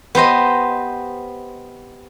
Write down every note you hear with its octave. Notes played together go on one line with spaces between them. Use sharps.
B3 G4 C5 D#5